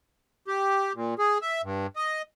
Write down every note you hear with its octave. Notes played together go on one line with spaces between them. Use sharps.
G4
A#2
G#4
E5
G2
D#5